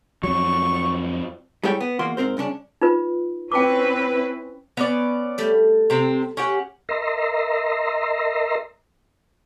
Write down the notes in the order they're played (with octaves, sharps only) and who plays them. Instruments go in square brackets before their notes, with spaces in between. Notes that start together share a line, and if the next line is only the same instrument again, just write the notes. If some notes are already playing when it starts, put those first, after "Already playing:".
[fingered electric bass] F2 F#3 [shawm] C#6
[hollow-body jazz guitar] G3 G#3 E4 A4 C#5 G5
B3
E2 A#3 F#4 C6
G#2 C4 A#4 C5
C2 C#3 C#4 D4
[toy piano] D#4 F4 B4
[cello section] C4 C#4 B4 [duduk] E4 [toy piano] G5 A5 D6
[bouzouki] B3 C#4 D5
[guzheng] G3 A3
[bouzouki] C3 C4
C#4 G4 F#5
[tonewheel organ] A#4 D#5 E5 A#5 C6